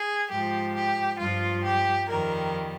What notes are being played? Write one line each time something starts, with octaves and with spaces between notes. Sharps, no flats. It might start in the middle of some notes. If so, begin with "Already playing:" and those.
Already playing: G#4
G#2 F3 G4
G4
G2 F3 F4
G4
F2 D#3 G3 A#4